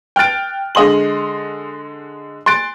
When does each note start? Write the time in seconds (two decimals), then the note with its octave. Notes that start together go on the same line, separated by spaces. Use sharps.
0.16 G5 F6 F#6 A6 D7
0.75 D3 G#3 D#5 C6 F#7
2.46 C6 F#6 A6 D7